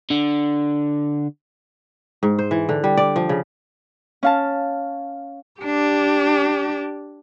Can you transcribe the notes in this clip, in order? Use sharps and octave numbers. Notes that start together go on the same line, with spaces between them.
D3
G#2
C5
E3
D3
G3
D5
F3
C#3
C#4 F5 A5
D4 G4